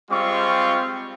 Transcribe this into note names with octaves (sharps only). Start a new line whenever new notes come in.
G3 G#3 C4 F4 C#6